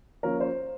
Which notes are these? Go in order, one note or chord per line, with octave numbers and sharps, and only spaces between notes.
F3 A#3 C#4 A#4
C5